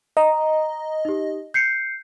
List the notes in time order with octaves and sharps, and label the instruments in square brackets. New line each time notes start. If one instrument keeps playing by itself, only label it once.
[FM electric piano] D#5 [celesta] A#5
[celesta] D#4 G4
G6 C7 C#7